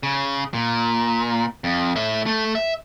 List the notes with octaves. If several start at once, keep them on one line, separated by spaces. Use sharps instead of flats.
C#3
A#2
F2
A2 E5
A3
E5